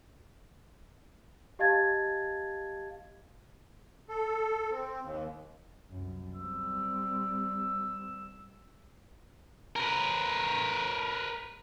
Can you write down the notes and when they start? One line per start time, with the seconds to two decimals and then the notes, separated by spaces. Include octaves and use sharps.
1.59 G4 D#5 F5 A5 G#6 A6
4.09 A4
4.71 C4
5.01 D#2
5.90 C2 F#2
6.36 G3 C4 E6
9.76 A#4 B4